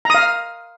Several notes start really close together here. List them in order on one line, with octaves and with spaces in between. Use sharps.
A#5 D#6 F5